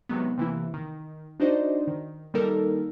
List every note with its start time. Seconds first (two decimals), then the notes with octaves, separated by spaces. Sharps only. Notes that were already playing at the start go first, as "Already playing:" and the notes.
0.09 C3 D#3 F#3 G#3 B3
0.38 C3 E3 A#3 E4
0.74 D#3
1.40 D4 D#4 F#4 C5 D5 D#5
1.87 D#3
2.34 D#3 G3 A#3 D#4 A4 A#4